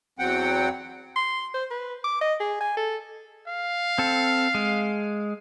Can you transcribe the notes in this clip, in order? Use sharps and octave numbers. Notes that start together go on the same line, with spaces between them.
E2 F#3 C4 F#5 G5
C6
C5
B4
D6
D#5
G#4
G#5
A4
F5
C4 A4
G#3